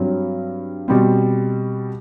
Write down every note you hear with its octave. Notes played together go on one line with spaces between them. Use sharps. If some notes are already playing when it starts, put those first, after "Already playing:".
Already playing: G2 F#3 C4
B2 G3 C4